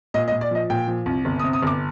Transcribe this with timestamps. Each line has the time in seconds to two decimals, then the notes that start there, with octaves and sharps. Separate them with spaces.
0.14 A#2 D#5
0.28 D#5
0.32 A#2
0.41 D5
0.51 F3 D#5
0.70 A#2 G5
0.88 F3
1.06 C2
1.25 G1
1.40 D#6
1.43 C3
1.53 D#6
1.62 G1 D6